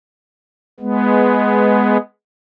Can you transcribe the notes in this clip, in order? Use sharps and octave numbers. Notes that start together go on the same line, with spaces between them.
G#3 B3